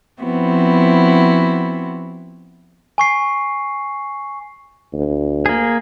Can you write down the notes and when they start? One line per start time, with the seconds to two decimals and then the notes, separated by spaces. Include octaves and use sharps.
0.21 F3 B3 C4 E4 F#4
2.98 G#5 C#6 C7
4.93 D2
5.46 A#3 G#4